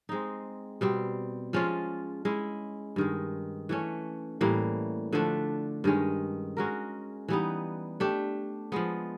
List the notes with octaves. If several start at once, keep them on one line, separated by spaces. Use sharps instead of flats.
G#3 C4 D#4
B2 G3 C4
F3 G#3 C#4 F4
G#3 C#4 E4
G2 D#3 G#3
E3 A3 C#4
A2 E3 G3 A#3
D3 F3 A3 D4
G2 D#3 G#3 C#4
G#3 C#4 F#4 A#4
E3 G3 B3 D#4
A3 D4 G4
F3 G#3 B3